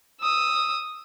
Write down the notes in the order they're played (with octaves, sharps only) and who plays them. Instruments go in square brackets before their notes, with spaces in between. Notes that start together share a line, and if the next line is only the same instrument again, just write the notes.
[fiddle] D#6 E6